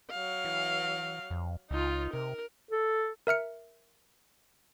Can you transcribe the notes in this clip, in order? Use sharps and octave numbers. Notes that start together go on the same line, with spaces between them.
F#3 F5
E3
F2
C#2 D#4 F4
C3 A#4
A4
A#4 E5 F6 C#7